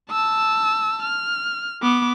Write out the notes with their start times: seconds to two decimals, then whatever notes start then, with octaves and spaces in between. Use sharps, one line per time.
0.10 A5 E6
1.03 F6
1.82 B3 D6